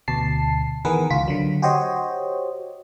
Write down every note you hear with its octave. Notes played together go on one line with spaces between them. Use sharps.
D2 B2 A5 C7
D#3 E3 B3 G#4 A#4 B4
C#2 F4 B6
D3 F#3
F#4 G4 C5 C#5 D#5